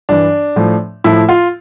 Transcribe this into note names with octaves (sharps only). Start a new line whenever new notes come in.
G2 E3 D4
A2 F3
A2 F3 E4
F4